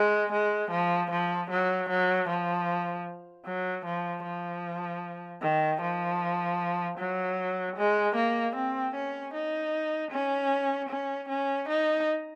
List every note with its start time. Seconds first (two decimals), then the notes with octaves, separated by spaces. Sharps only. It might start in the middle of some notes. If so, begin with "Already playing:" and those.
Already playing: G#3
0.32 G#3
0.71 F3
1.11 F3
1.50 F#3
1.89 F#3
2.28 F3
3.45 F#3
3.85 F3
4.24 F3
5.42 D#3
5.81 F3
6.98 F#3
7.76 G#3
8.15 A#3
8.55 C4
8.95 C#4
9.34 D#4
10.11 C#4
10.90 C#4
11.29 C#4
11.69 D#4